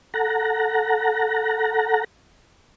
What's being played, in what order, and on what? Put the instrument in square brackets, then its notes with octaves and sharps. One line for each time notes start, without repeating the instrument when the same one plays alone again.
[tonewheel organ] A4 F#5 A#5